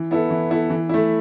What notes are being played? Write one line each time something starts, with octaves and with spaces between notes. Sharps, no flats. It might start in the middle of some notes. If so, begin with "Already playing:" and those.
Already playing: E3
B3 E4 A4
E3
B3 E4 A4
E3
A3 E4